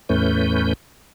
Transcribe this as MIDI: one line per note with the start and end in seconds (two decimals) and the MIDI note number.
0.09 0.73 40
0.09 0.73 45
0.09 0.73 57
0.09 0.73 61
0.09 0.73 71
0.09 0.73 91